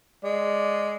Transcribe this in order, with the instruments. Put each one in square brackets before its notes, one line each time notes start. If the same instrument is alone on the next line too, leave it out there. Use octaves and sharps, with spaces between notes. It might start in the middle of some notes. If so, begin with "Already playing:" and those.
[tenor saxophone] G#3 [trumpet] D5